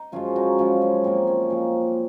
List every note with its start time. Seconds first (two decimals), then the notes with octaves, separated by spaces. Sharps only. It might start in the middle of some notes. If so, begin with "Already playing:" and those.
Already playing: D#4
0.12 F#2 F3 G#3 C#4 F4
0.36 D#4 F#4
0.58 F#2 F3 G#3 C#4 F4
0.82 C#4
1.04 A#2 F3 A#3 C4
1.27 C#4
1.50 A#2 F3 A#3 C4